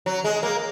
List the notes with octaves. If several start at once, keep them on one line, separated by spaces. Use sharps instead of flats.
F#3
G#3
A#3